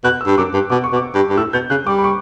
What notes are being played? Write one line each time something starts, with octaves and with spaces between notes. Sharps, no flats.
B2 F#6
E6
G2
F#2 D6
G2
B2 D6
C#6
B2
D6
G2
G2
A2 E6
B2 G6
C#3 F#6
G3 D6
B5
C#6